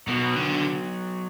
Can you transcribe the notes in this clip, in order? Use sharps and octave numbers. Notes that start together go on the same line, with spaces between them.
B2 F#3 B3 F#4
D3